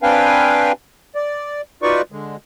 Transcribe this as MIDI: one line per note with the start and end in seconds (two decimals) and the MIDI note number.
0.03 0.72 60
0.03 0.72 62
0.03 0.72 71
0.03 0.72 77
0.03 0.72 79
0.03 0.72 80
1.15 1.61 74
1.82 2.02 63
1.82 2.02 65
1.82 2.02 66
1.82 2.02 71
1.82 2.02 74
1.82 2.02 85
2.12 2.36 50
2.12 2.36 56